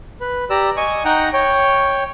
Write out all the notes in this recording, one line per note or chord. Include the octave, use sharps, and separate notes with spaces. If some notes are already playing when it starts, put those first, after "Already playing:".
B4
G4 D5 A#5 E6
D#5 G#5 C#6
D#4 F#5 G5 A#5
C#5 G5